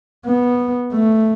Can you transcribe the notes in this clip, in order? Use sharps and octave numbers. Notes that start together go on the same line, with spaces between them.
B3
A3